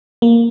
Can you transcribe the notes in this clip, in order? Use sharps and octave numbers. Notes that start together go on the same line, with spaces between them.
A#3